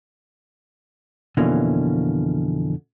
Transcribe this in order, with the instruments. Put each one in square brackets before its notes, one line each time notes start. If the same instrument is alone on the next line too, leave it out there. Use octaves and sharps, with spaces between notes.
[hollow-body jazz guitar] F2 B2 D3 E3 A#3 C#4